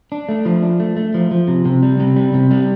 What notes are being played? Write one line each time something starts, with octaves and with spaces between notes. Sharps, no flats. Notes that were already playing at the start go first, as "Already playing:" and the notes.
D4
A3
F3
D4
A3
A3
F3
F3
C3
C3
G3
C3
G3
C3
G3